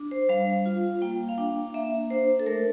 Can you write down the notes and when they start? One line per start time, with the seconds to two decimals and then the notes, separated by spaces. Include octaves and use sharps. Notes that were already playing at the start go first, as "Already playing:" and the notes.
Already playing: D4
0.11 C5
0.29 G3 F5
0.66 F4
1.02 A#3 G5
1.29 F5
1.38 D4 G5
1.74 A#3 E5
2.10 D4 C5
2.40 A4
2.46 A3 A#4